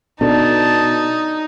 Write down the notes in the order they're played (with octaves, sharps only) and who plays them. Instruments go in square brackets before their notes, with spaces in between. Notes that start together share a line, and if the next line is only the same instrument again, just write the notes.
[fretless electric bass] B2 [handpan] D4 A4 [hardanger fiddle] D#4 [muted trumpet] A5